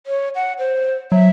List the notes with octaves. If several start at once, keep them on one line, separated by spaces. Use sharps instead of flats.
C#5
F#5
C5
F#3 E5